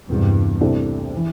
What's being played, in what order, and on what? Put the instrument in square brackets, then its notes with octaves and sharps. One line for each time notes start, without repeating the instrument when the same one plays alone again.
[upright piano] E1 E2 C3 [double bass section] G2
[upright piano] C2 C3 A3 D4
E3